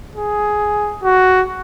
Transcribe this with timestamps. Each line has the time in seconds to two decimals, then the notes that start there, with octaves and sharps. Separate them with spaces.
0.16 G#4
1.04 F#4